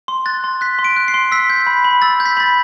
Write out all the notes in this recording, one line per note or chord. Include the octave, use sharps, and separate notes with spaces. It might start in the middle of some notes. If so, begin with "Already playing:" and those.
C6
F#6 A6
C6
F#6 B6
C6
D7
F#6
C7
C6
E6 B6
G6
B5
B5
E6 A6
G6
B6
B5 A6